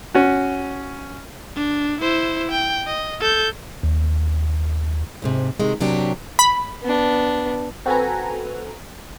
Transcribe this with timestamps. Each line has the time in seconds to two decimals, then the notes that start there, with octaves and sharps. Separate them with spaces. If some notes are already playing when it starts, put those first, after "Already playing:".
0.14 C#4 F#4
1.56 D4
2.01 E4 C5
2.51 G5
2.87 D#5
3.21 A4 G6
3.83 D#2
5.22 D2 G#2 C3
5.60 C3 D#3 G#3
5.80 C3 F#3 A#3 D4 G4
6.39 B5
6.83 B3 D4
7.86 C4 F#4 A4 B4 G#5 A#5